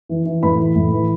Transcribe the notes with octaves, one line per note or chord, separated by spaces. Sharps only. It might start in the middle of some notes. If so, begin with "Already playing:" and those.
E3
E3
A2 B4 B5
E3
A2
E3